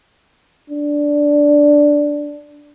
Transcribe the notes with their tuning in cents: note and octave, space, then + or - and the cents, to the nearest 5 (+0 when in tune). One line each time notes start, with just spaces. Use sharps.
D4 -5